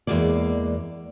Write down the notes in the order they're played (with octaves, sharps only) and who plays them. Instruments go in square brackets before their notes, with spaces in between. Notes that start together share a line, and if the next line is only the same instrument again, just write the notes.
[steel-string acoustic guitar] E2 A#2 G#3 A#3 D5